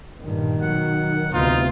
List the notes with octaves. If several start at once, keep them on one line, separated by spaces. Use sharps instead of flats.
G2 A#2 D#3
B2 F#3 F#5
D2 C3 B3 D#4 F4